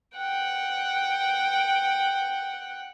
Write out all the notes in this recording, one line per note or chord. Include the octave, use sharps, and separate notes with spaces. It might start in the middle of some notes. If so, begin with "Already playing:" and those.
F#5 G5